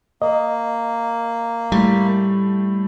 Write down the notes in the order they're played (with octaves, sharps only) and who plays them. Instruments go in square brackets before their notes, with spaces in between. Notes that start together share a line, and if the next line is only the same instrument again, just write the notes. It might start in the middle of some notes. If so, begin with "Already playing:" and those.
[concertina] A#3 [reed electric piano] D#5
[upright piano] A2 [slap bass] G3